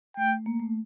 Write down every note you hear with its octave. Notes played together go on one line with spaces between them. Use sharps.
A3 G5
A#3
A3